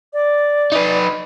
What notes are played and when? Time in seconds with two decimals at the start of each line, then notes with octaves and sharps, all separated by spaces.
0.13 D5
0.72 D#4 B4